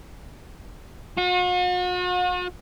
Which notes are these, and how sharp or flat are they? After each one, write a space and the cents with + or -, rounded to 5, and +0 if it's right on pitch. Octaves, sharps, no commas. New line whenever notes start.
F#4 -45